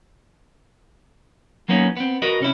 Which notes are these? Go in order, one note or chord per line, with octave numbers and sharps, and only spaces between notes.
F#3 A#3 B3 C#4 D#4
B3 C4
F#4 A#4 B4 D#5
C3 C#4 E4